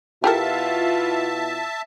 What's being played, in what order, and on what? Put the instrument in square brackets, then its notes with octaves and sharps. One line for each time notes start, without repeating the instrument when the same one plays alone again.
[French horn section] B2 E4 F4 [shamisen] G4 A4 A#4 [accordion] E5 A5